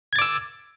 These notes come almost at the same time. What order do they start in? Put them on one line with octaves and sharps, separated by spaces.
G#6 A6 D6 E6